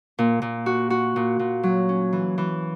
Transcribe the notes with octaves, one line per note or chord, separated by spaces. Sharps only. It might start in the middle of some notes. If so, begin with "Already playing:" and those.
A#2
A#2
F#4
F#4
A#2
A#2
F#3
C#4
E3
E3